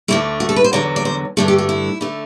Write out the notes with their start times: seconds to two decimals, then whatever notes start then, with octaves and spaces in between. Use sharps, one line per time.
0.08 D2 D3 A3 E4
0.40 F#4
0.49 A4
0.56 B4
0.64 C5
0.73 E2 D3 F#3 D5
0.96 D5
1.05 C5
1.37 G2 D3 A3 A4
1.48 G4
1.58 F#4
1.69 E4
2.01 D3 A3